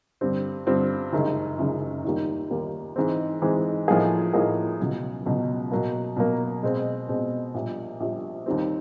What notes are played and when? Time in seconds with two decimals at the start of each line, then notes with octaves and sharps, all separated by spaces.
0.21 G2 D3 G3 C4
0.67 G2 D3 G3 C4
1.13 F#1 F#2 D#3 G#3
1.59 F#1 F#2 D#3 G#3
2.04 D#2 D#3 G3 A#3
2.50 D#2 D#3 G3 A#3
2.96 G#2 E3 G#3 C4
3.42 G#2 E3 G#3 C4
3.88 A2 F3 A#3 D#4 G#4
4.33 A2 F3 A#3 D#4 G#4
4.80 C#2 B2 F#3
5.26 C#2 B2 F#3
5.71 B2 F#3 A#3
6.16 B2 F#3 A#3
6.63 B2 G#3 C4
7.09 B2 G#3 C4
7.54 A#1 A#2 G3
8.00 A#1 A#2 G3
8.46 D#2 D#3 G3 C4